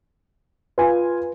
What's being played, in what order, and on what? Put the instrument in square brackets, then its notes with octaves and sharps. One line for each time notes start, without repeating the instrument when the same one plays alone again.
[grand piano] F4 G#5 [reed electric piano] B4